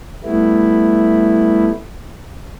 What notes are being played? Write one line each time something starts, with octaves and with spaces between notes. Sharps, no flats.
G3 A3 B3 E4